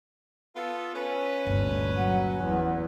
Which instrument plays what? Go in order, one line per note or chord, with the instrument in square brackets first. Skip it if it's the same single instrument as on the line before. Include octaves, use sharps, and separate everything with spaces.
[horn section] B3 F4 A4
C#4 B4
[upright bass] G1 A#2 [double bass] D2
[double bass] F#3 [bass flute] F#5
[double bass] E2